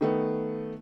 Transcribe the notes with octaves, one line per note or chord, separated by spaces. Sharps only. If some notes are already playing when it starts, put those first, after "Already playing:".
D#3 A3 B3